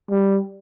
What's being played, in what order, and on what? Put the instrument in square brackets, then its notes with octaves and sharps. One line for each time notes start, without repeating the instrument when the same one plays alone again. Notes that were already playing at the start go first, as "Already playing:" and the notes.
[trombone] G3